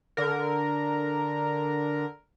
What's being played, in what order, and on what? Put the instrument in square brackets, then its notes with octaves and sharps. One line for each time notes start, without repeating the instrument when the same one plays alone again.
[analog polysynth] D3 A#4